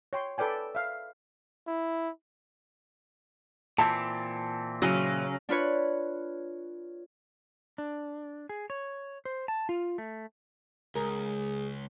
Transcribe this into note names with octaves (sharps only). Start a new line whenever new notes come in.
C#5 G5 C6
A4 B4 D5 G5 G#5
E5 F5
E4
A#2 E3 C4 A5
C#3 F#3 C#4
D4 F4 B4 C#5
D4
G#4
C#5
C5
A5
F4
A3
C#2 G#3 G#4 A#4